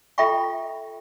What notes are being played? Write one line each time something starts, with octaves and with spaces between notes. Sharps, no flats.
F4 A4 E5 G5 B5 C#6